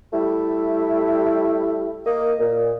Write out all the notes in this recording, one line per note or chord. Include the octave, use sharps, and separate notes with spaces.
G3 A3 E4
A#3 D#5
A#2